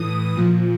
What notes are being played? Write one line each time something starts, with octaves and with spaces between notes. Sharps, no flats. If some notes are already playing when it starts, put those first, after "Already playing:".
Already playing: A2 E3 D#6
A#2 F3